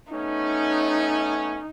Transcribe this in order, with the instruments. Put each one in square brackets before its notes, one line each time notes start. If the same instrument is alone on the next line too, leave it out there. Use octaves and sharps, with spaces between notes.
[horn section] A3 B3 C#4 [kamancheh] D#4